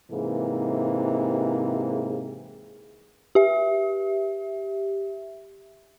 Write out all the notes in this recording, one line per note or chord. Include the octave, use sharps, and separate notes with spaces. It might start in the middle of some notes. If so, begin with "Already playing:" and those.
G#2 C3 E3 A#3 G#4
G4 E5